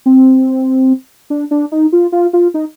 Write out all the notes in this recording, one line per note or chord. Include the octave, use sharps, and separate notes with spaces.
C4
D4
D4
D#4
F4
F4
F4
D#4